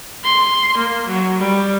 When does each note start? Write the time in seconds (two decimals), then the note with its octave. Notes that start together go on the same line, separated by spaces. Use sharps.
0.24 C6
0.77 A#3
1.06 F#3
1.38 G3